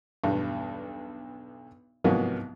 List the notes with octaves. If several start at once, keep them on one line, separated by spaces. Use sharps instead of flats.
B1 E2 G2
C2 G#2 F3 F#3 A#3 B3